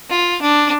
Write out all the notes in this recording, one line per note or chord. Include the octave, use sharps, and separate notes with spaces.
F4
D4